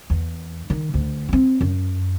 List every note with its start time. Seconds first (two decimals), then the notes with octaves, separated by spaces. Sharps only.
0.10 E2
0.70 D#3
0.94 D2
1.29 B3 C4
1.61 F#2